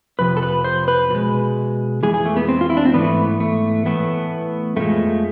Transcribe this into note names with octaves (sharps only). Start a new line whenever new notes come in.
F2 C3 F3 B4
A4
B4
C5
B4
B2 G#3
F2 E3 G#3 G#4
G#4
A3
B3
C4
F4
E4
D4
C4
G#2 E3 A3 B3
A3
A2 E3 A3 B3
F2 D3 F3 G#3 A3